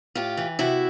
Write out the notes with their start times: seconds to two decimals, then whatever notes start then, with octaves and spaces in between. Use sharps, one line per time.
0.15 A2 F4 G4
0.37 E3
0.59 C3 E4 F#4